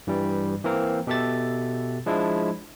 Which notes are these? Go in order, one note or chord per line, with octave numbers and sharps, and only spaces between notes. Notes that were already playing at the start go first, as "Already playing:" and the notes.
G2 E3 G3
E3 A#3 C4 A#4
B2 G4 A4 E5 A6
F3 G#3 D4 E4